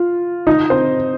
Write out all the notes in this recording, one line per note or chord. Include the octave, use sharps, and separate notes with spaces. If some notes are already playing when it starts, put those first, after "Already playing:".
Already playing: F4
D#4 D#5
C4 C5